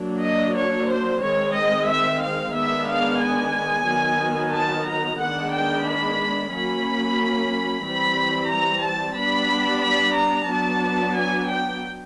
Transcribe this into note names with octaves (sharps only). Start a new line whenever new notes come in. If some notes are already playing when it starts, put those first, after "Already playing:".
Already playing: F#3 A#3 D4
D#5
C#5
C5
D#3 G#3 C4 C#5
D#5
E5
F5
D#3 G#3 B3 D4 E5
F5
G#5
D#3 F#3 B3
A5
A#5
D#3 G#3 B3 D4 F#5
G5
B5
F#3 A#3 C#4 B5
E3 G3 C4 B5
A#5
A5
G3 B3 D4 B5
B5
A#5
F#3 B3 D4 A5
G#5
G5